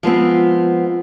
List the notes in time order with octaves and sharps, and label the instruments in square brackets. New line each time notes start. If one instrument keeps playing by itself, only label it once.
[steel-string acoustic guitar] F3 G#3 B3 C4